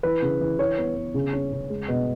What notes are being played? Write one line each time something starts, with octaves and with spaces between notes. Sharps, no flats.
E3 B4
C#3
E3
E3 C#5
B3
B3
C#3
C#4
C#3
G#3
B2